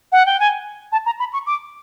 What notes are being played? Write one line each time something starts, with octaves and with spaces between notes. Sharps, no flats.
F#5
G5
G#5
A5
A#5
B5
C#6
D6